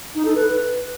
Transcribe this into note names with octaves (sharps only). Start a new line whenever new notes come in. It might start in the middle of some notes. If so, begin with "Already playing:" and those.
D#4
A4
B4